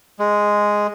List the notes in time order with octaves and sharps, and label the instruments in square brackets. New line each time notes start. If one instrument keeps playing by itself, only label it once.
[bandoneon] G#3